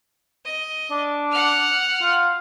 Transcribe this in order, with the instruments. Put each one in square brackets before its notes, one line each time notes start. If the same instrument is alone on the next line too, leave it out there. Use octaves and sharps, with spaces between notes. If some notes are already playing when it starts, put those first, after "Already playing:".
[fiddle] D#5
[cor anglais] D4
[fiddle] F#5 F6
[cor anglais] F4